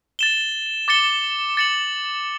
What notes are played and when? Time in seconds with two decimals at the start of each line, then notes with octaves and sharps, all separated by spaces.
0.19 A6 E7 G7
0.88 D6 A6 C#7 G7
1.57 A6 C#7 F#7